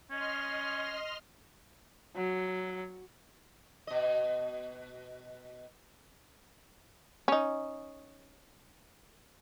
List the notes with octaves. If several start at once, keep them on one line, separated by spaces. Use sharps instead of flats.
C#4 D#5 C6 F6
F#3
B2 D#5
C#4 D#4